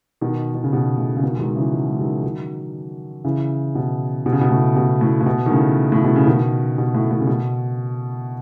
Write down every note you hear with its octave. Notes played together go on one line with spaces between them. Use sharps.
B2 D#3
D#3
C#3
B2
A2 C#3
C#3
B2 D#3
G#3
D#3 F#3
C#3 E3
F#3
G#3
D#3 F#3
D#3 F#3
C#3 E3
B2
B2
C#3
B2
A2 C#3
B2
A2
A2
B2
D#3
A2 C#3
A2
B2
C#3
B2 D#3
B2
A2
A2
C#3
B2